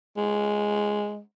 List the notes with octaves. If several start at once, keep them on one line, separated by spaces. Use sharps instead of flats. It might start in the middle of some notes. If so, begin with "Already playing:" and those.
G#3